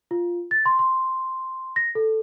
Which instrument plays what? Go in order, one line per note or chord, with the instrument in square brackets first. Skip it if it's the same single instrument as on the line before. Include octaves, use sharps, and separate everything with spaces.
[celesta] F4
A6
C6
C6
A#6
A4